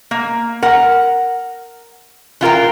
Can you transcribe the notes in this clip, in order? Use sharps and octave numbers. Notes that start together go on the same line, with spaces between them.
A#3
A#4 F#5
E3 F4 A#4 G5